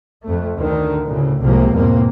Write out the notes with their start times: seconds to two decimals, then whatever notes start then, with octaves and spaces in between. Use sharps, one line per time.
0.24 F2 A3
0.56 D2 D3 D#3
1.05 D2 A2 C#3
1.41 C2 A2 C3 F3 G#3 A#3
1.73 E2 G#2 B2 A#3 C4